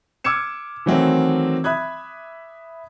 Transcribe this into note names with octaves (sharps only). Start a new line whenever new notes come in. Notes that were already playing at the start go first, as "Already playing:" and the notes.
D6 E6 F6 G#6 C#7 E7
D#3 E3 F#3 A3 C4
E5 B5 D#6 F#6 G#6